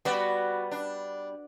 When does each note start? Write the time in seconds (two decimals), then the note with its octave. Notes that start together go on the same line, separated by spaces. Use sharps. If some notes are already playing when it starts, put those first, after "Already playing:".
0.05 G3 B3 F#4 B4 D5
0.71 D4